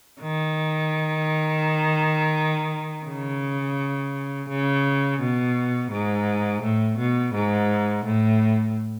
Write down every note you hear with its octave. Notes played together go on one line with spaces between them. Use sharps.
D#3
C#3
C#3
B2
G#2
A2
B2
G#2
A2